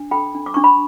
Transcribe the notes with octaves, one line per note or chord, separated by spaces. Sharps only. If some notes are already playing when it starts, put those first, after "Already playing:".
Already playing: D4
A4 G5 B5
D4
D6
D4 C#6
B5